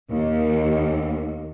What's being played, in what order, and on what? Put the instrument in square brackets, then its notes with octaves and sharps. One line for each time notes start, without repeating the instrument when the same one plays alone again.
[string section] D#2